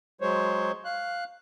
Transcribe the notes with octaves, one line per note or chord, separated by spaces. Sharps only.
F#3 G#3 C5 C#5
F5 F#6